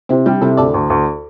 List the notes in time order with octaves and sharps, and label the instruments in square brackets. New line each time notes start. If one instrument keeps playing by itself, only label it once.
[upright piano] C3 [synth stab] C4 E4
[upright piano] G3 [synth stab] D4 G4
[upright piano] C3 [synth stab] E4 A4
[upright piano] D2 [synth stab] A4 D5
[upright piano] D2
D2